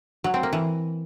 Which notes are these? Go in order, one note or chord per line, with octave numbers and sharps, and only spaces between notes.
F#3
C4
A#3
E3